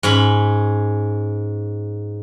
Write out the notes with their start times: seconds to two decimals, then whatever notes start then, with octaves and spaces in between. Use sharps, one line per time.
0.03 G#2 C#4 B5